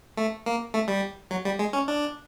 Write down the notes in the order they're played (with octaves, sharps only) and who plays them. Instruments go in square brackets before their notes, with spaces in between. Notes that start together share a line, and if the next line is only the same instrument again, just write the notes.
[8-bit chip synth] A3
A#3
A3
G3
F#3
G3
G#3
C#4
D4